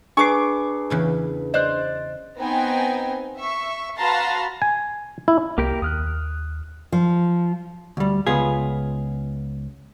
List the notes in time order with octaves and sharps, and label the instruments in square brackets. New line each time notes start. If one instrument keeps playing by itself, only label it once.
[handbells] D4 G#4 B4 [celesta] G#5 C7 [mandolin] C#6 D6
[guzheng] E2 C#3 E4
[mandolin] C5 D5 [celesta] D#5 F#6
[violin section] B3 C4 D#4 G5 G#5
E5 C#6
F#4 B4 F5 A5 A#5 C6
[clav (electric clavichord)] G#5
E4
[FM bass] C2 [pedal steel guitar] A#3 G4 A#4
[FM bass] D#2 [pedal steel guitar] D#6 F6 F#6
[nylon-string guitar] F3
[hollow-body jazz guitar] D2 G3
C#2 B3 F4 G#4